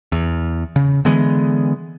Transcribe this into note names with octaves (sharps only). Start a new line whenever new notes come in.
E2
C#3
D3 E3 G#3 B3